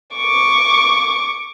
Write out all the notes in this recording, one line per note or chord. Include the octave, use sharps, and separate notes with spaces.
C#6 D6